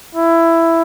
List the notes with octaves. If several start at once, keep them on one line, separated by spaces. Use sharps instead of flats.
E4